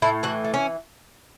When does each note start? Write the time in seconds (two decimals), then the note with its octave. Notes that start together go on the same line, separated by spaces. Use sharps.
0.02 A2 E4
0.23 E3 F#4
0.44 A3
0.54 C#4